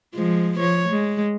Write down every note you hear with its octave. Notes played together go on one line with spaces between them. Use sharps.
F3 G#3
F3 C#5
G#3